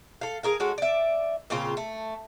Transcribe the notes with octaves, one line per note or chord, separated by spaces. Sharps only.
A4 F5
G#4 A#4 F5
G#3 C#4 F#4 A4
D5 E5
A#2 C#3 C4 F4
A3